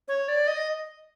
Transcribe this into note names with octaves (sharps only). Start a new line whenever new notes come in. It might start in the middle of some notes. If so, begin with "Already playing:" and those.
C#5
D5
D#5